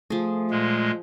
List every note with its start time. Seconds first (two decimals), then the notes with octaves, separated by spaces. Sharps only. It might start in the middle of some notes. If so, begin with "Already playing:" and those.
0.10 F3 A3 G#4
0.51 A#2 G#3